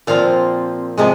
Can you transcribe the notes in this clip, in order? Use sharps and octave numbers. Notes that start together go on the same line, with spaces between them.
A#2 F3 C4 F5
C3 F3 G#3